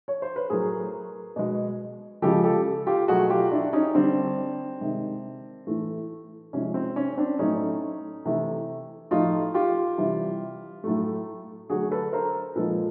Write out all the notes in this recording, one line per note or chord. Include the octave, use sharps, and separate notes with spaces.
C#5
C5
B4
A2 F#3 A3 G#4 A#4
B2 G#3
C#3 F3 G#3 G4 A4
G4 A4
F4 G4
B2 F#3 A3 F#4 G#4
F4 G4
D4 E4
C#4 D#4
D3 G3 C4 D4
C3 D#3 G#3
A2 E3 A3
C3 F3 G#3 C#4
C4
C#4
C4 D4
A2 F#3 A3 C#4 D#4
C3 E3 A3
A2 F3 A3 D#4 F4
F4 G4
C3 E3 G3
A2 F#3 A3
D3 F#3 A3 F#4 G#4
A4 B4
A#4 C5
A#2 F3 G#3 A4 B4